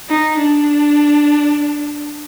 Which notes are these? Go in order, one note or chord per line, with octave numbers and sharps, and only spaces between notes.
D#4
D4